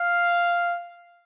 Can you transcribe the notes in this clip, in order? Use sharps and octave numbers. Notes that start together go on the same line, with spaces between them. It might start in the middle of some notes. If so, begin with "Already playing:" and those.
Already playing: F5